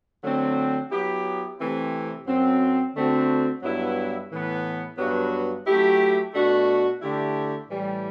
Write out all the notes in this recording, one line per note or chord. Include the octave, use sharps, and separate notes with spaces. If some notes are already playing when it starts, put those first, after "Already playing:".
D3 F#3 A3 C4
F#3 B3 E4 G4
C3 E3 A3 C4 E4
F#2 F#3 C4
D3 A3 C4 F#4
G2 F#3 B3 E4
A2 E3 B3
G2 F#3 B3 F#4
F#3 A3 E4 G4
B2 A3 D4 F#4
D3 A3 E4 G4
A2 E3 G3